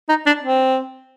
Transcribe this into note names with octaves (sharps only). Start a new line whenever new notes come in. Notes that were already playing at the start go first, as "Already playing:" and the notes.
D#4
D4
C4